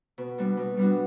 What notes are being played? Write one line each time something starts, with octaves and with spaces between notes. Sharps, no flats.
B2
G3 B3 D4 F#4
B2
G3 B3 D4 F#4